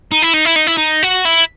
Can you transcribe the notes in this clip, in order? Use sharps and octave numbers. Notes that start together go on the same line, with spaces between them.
D#4
E4
D#4
E4
D#4
E4
D#4
F#4
E4